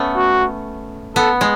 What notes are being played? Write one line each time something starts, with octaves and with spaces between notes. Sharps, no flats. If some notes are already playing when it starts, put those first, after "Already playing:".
Already playing: A3 B3 C#4
F#4
B3 A4
G#3